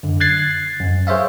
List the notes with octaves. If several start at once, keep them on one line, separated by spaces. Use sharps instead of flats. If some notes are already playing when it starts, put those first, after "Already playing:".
F#2 D3
F#6 G#6 A6 C7
F#2
G#4 C5 C#5 E5 F5